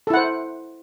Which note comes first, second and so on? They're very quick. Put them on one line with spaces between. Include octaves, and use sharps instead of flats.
A4 E4 F#5 C5